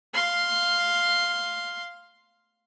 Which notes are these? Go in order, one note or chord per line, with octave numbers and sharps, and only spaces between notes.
F5 C6